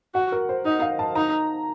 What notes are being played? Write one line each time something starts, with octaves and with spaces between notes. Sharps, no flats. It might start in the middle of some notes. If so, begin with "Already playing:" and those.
F#4 F#5
A#4
C5
D#4 D#5
F5
A5
D#4 A#5